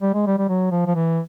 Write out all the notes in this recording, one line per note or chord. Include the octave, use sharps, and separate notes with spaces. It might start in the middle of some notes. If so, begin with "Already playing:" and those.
G3
G#3
G3
G3
F#3
F3
F3
E3